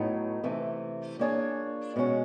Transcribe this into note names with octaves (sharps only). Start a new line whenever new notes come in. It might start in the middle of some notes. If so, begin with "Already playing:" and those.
Already playing: A2 F#3 B3 D#4
C3 E3 A3
A#3 D4 F4 G#4 C#5
B2 G#3 C#4 F#4